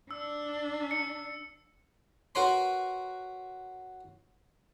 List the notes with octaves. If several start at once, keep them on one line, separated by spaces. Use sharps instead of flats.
D4 E6
C#7
F#4 A#4 B4 C#5 B5 C6